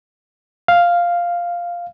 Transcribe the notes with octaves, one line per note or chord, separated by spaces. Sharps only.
F5